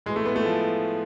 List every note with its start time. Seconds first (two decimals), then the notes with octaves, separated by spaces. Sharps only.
0.06 A2 G#3
0.09 E3
0.16 A3
0.26 B3
0.36 A3
0.45 F3